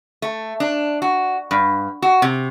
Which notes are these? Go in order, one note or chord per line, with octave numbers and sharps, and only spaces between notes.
A3
D4
F#4
G2
F#4
C3